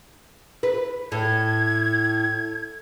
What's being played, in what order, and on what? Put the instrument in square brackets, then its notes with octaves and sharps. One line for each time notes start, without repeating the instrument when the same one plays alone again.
[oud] B4
[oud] A2 [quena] G#6